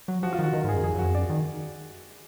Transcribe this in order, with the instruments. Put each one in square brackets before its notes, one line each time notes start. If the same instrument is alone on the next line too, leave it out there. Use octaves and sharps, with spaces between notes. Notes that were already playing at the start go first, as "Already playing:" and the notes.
[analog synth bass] F#3
[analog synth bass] F3 [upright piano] F#4
[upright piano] F4
[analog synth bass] D#3 [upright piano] F#4
[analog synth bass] D#3 [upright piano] A#4
[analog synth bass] G#2
[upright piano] G#4
[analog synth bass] F#2
[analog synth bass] F2 [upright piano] G#4
[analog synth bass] F#2
[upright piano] F#4
[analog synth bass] F2
[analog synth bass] F#2 [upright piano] D5
[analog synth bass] D#3